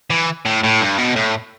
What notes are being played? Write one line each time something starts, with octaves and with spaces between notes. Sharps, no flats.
E3
A2
A2
G2
B2
A2